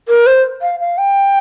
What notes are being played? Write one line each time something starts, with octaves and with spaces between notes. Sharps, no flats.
A#4
C5
F5
F5
G5